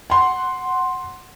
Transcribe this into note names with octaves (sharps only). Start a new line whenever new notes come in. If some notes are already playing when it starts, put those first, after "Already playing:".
F#5 C6